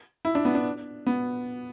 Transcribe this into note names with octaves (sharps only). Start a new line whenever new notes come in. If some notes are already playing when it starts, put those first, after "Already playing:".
E4
D4
B3
D4
B3